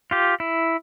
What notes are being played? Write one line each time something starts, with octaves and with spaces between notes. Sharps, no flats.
F4 G4
E4